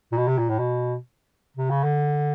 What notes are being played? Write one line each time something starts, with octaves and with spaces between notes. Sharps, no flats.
A#2
B2
C3
A#2
A2
B2
C3
C#3
D3